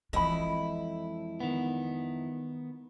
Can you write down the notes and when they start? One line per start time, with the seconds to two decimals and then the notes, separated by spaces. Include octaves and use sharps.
0.13 F2 E3 G#3 E4 D#5 B5
1.40 D#3 B3